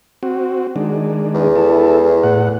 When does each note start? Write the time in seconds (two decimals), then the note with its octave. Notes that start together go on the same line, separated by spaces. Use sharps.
0.23 C4 F#4
0.76 D#3 G#3 D4
1.34 E2
1.56 E4 A4
2.24 A2 F#5